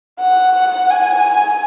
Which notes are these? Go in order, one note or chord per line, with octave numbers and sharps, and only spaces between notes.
F#5
G#5